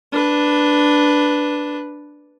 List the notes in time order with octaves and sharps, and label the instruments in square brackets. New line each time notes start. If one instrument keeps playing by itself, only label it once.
[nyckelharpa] D4 B4